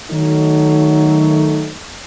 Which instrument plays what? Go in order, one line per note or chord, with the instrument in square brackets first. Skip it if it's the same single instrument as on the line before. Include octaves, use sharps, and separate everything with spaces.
[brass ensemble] D#3 F#3 A3 D#4